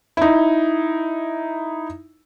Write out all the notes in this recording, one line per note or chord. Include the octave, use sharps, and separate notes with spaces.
D#4 E4